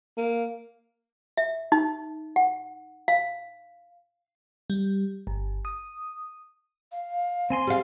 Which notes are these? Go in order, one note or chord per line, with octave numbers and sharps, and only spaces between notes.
A#3
E5
D#4
F#5
F5
G3
G1
D#6
F5
C4 G#5 C6
G3 G#4 F5